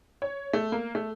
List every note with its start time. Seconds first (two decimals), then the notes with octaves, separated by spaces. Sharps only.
0.22 C#5
0.53 A3
0.72 A#3
0.95 A3